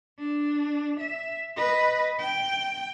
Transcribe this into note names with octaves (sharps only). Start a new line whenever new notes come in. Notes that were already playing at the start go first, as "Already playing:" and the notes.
D4
E5
B4 D#5
G5